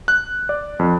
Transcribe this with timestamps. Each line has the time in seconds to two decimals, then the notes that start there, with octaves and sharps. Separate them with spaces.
0.08 F#6
0.49 D5
0.79 F2